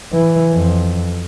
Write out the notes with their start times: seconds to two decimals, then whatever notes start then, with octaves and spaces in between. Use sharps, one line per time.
0.13 E3
0.53 F2